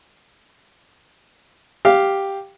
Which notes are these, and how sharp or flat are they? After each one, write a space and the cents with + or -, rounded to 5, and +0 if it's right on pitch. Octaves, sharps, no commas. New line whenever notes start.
G4 +0 F5 +0